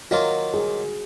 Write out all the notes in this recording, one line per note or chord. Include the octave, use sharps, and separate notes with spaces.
D#3 F#3 A#3 F4 F#4
G#4